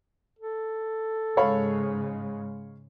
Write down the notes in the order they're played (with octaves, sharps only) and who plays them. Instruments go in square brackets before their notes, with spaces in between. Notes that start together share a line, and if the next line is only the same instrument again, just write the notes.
[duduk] A4
[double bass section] G#2 C#3 G#3 [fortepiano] C#5 F5 B5